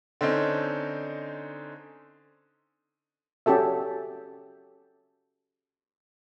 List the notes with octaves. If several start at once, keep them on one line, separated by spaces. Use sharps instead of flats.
D3 C4 C#4 D#4
C#4 F#4 G4 A4 E5